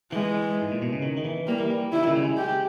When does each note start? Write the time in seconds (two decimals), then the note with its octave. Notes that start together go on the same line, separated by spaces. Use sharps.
0.12 E3 G#3
0.62 G#2
0.72 A#2
0.82 B2
0.93 C#3
1.02 D#3
1.17 D#3
1.25 E3
1.47 G3 A#3
1.60 E3
1.70 G3
1.92 D#3 E4
2.07 C#3
2.16 G3
2.22 G#3
2.38 G4